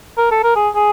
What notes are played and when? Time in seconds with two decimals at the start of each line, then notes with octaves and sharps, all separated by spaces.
0.18 A#4
0.31 A4
0.44 A#4
0.56 G#4
0.75 G#4